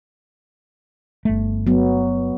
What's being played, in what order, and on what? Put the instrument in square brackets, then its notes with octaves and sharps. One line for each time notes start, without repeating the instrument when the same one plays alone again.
[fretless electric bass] G1 A3
[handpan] F#3 B3